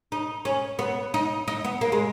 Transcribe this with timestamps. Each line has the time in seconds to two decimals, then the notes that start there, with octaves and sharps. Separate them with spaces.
0.12 D#4
0.45 C#4
0.79 B3
1.14 D#4
1.48 D#4
1.65 B3
1.81 A#3
1.92 G#3